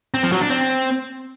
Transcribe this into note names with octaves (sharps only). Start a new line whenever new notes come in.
C4
F3
F#3
D4
C4